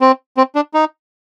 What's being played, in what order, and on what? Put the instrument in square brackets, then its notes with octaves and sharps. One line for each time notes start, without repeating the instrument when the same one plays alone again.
[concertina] C4
C4
D4
D#4